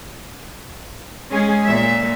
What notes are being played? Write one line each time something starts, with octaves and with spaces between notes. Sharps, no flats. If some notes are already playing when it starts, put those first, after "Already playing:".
G#3 C#4 G#4
A#2 E5